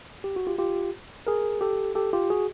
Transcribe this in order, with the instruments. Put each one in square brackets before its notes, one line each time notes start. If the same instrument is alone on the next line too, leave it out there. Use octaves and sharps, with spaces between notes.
[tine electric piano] G4
F#4
F4 G4
F4 G4
G#4 A#4
G4 A4
G4 A4
F4 G4
F#4 G#4